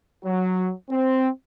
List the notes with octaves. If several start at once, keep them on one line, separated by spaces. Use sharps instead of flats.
F#3
C4